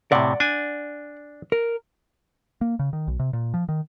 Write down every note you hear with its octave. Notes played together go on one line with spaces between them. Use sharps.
A2 C3 D5 F#5
D4 G#5
A#4
A#3
C#3
D#3
B1
C3
A#2
F3
D#3